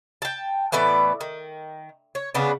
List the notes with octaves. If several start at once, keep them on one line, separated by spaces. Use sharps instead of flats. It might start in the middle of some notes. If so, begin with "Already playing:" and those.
G5 A5
A2 E3 B3 D5
D#3
C#5
C#3 B3 D4